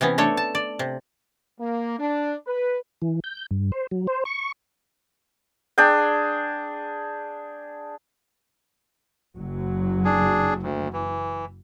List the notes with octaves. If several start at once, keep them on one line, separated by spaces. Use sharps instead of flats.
C3 E3 B3 C#4
A3 D4 A4 C#5
A5
D5
C3
A#3
D4
B4
E3
G6
G2
C5
F#3
C5
C#6
D4 G#4 G5
F#1 F#3
D4 G#4
D2
E3